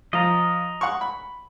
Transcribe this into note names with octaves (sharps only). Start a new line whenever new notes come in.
F3 D#5 A#5
F#5 C6 C#6
B5